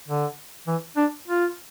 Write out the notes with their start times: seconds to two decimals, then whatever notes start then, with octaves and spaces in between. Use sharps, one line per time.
0.08 D3
0.67 E3
0.97 D4
1.28 F4